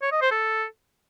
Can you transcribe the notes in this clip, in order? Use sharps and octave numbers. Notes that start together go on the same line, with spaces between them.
C#5
D#5
C5
A4